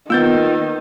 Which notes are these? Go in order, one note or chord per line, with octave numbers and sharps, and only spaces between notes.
D#3 A#3 B3 F4 B4 E6 G6 A6